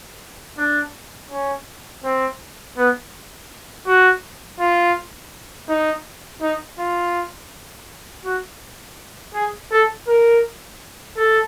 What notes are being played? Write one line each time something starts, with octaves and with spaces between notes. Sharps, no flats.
D4
C#4
C4
B3
F#4
F4
D#4
D#4
F4
F#4
G#4
A4
A#4
A4